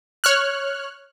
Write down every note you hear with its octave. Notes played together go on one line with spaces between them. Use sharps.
C#5 F6 F#6